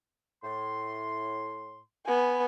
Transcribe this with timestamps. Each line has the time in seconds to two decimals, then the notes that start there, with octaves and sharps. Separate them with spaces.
0.43 A2 C6
2.06 B3 G#5